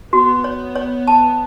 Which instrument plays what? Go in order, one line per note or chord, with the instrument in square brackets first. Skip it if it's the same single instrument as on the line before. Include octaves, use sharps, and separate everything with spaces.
[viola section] B3 [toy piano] F#4
[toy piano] C#5
C#5
A5